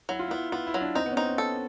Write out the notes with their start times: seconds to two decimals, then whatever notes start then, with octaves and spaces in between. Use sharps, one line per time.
0.09 F#3 E4
0.19 F4
0.28 E4
0.31 B3
0.52 B3 F4
0.67 E4
0.74 F#3
0.81 D4
0.95 C4 D#4
1.06 B3
1.12 C#4
1.17 C4 D#4
1.28 C#4
1.38 A4